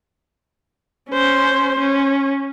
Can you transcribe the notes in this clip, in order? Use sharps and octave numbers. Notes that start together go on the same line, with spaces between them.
C#4 C5
C#4